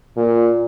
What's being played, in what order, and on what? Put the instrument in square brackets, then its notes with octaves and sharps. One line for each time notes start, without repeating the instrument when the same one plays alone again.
[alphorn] A#2